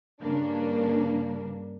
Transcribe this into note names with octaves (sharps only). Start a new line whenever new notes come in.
G2 C#3 A#3 D4